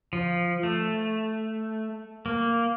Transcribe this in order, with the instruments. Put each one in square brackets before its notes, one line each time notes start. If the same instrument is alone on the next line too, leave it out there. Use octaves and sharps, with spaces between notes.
[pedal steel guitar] F3
A3
A#3